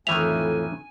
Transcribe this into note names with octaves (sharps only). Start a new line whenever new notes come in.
F2 A2 D#3 E3 E5 G#5 F7